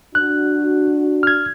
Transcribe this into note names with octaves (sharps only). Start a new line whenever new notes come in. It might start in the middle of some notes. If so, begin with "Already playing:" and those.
D4 F#4 F#6
F6 G#6